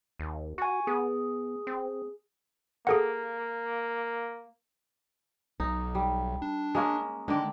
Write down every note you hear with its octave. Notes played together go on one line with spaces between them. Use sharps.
D#2
F#4 G#5 C#6
B3 G#4
C4
A#3 G#4 A4 F#5
B1 D#4
G3
D4
G#3 A#3 C#4
D3 D#3 G#3 D5